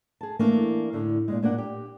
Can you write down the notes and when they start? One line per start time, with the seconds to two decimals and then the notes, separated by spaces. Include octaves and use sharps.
0.21 G#4 A5
0.39 E3 A3 A#3 D4
0.93 A2 D3
1.28 A#2 C#3 G#3
1.43 A#2 A#3 D4 F#5
1.58 G4